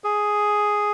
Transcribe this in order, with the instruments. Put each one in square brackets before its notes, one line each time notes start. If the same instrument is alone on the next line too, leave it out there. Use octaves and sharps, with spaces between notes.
[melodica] G#4